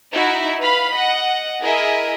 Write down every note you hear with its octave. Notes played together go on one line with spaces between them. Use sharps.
D#4 E4 F#4 E5
B4 F5 B5
D#5 F#5
E4 G#4 A#4 D#5 E5